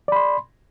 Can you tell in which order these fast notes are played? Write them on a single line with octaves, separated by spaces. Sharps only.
D5 B5 C6